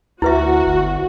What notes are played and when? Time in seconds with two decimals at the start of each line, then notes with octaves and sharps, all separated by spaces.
0.22 D2 E4 F#4 B4 E5
0.67 G1